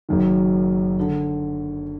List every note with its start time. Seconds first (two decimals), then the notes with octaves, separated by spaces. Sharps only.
0.09 F#1 F#2 D#3
1.00 D3